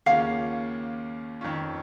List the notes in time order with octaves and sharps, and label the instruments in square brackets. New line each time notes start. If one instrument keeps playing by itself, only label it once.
[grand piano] D#2 C#3 A#3 C#4 F4 [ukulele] F5
[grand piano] F2 D#3 C#4 F4